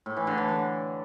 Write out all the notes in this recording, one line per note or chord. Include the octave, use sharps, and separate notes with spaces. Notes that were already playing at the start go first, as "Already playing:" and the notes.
A2
E3
D3
E3
D3